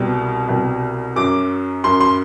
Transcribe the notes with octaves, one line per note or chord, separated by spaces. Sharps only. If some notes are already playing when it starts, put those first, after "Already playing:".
Already playing: C2 B2 G3
C2 B2 G3
F#2 F#3 D6
F#2 F#3 C6
C6